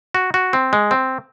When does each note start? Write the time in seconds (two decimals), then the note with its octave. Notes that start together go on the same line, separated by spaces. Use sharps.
0.15 F#4
0.34 F#4
0.53 C4
0.73 G#3
0.91 C4